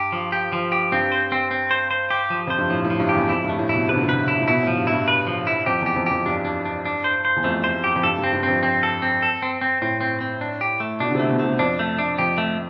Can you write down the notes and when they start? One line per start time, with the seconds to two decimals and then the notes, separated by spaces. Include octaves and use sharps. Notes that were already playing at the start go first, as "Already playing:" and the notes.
Already playing: G2 G4
0.12 F3
0.32 G4
0.53 F3
0.72 G4
0.92 G2 C4
1.12 C5
1.32 C4
1.51 C4
1.71 C5
1.91 C5
2.11 G4
2.30 F3
2.47 F2 C5
2.58 G2
2.70 A2 F3
2.85 A2
2.90 F3
3.00 G2
3.09 G4
3.15 E2
3.29 F2 E4
3.44 G2
3.49 A3
3.59 A2
3.69 B2 E4
3.89 C3 B4
3.96 D3
4.03 C3
4.09 B4
4.28 E4
4.40 A2
4.48 B2 E4
4.63 A2 F3
4.77 G2
4.87 E4
4.92 G2
5.08 B4
5.27 F3
5.47 E4
5.66 F2 G4
5.81 E2 G4
5.96 F2
6.06 F2 G4
6.26 G2 D4
6.45 D4
6.65 D4
6.85 D4
7.04 C5
7.25 C5
7.36 E2
7.44 F2 A3
7.64 C5
7.84 G4
7.96 F2
8.03 G2 A4
8.18 G2
8.24 C4
8.33 G2
8.43 F2 C4
8.63 C4
8.83 A4
9.02 C4
9.22 A4
9.42 C4
9.61 C4
9.82 A2 C4
10.01 C4
10.21 C4
10.41 D4
10.61 G4
10.80 A3
11.00 B2 D4
11.10 D3
11.15 C3 A3
11.30 B2
11.39 C3 A3
11.59 F2 D4
11.79 A3
11.99 D4
12.18 F2 G4
12.38 A3